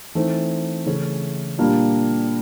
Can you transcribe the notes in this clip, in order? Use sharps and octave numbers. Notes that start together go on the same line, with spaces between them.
E3 A3 C4 D#4
C#3 E3 A3 C#4
A#2 G3 A#3 D4 F4